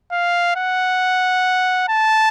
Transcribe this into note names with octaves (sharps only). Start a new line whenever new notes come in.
F5
F#5
A5